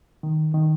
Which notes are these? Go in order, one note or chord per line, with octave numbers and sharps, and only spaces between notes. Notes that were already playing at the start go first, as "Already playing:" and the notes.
D#3
D#3